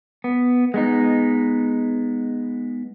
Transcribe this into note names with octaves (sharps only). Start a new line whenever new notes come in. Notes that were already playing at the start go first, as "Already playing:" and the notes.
B3
G#3 B3 D#4